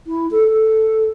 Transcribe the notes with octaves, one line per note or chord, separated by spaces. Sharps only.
E4
A4
A4